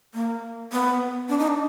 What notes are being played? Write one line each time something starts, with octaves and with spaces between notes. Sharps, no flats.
A#3
B3
D4
D#4
D4